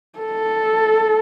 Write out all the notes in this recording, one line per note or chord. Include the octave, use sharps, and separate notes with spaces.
A4